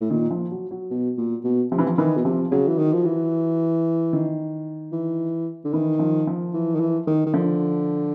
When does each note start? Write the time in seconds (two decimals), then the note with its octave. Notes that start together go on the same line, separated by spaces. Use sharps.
0.01 A2
0.10 A#2 D#3
0.31 F3
0.51 F#3
0.71 F#3
0.91 B2
1.18 A#2
1.44 B2
1.72 C3 F3
1.79 E3
1.87 F3
1.98 D#3 E3
2.17 B2
2.25 C3 F3
2.51 C#3 F#3
2.68 E3
2.79 D#3
2.93 F3
3.05 E3
4.13 D#3
4.92 E3
5.65 D3
5.73 D#3 E3
5.99 F3
6.27 F3
6.54 E3
6.75 D#3
6.80 E3
7.07 D#3
7.26 D#3
7.34 D3 F3